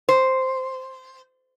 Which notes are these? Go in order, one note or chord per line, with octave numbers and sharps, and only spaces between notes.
C5